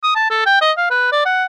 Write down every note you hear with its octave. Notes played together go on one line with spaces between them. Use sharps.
D#6
A5
A4
G5
D#5
F5
B4
D5
F#5